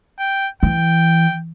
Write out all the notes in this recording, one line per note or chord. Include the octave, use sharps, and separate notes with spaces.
G5
E3 G5